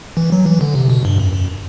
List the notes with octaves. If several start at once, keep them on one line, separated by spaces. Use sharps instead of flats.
E3
F#3
E3
D3
C3
B2
G2
F#2
F#2